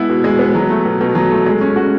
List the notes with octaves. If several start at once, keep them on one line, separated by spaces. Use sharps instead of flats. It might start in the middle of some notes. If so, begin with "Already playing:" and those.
Already playing: G#3 B3 E4
B2
G#3
B3
F#3
A3
B2
B2
F#3
A3
G#3
C#4
F#4